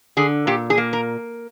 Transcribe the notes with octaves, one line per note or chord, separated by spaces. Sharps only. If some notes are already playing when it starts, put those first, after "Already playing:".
D3 G#4
A#2 G4
G#4
A#3
A#4